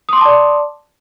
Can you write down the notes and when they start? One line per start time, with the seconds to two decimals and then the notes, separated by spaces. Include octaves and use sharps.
0.09 D#6
0.13 C6
0.17 D6
0.21 A5
0.25 D5